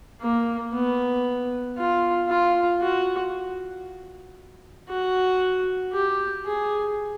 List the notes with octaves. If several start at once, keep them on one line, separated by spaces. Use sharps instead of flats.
A#3
B3
F4
F4
F#4
F#4
G4
G#4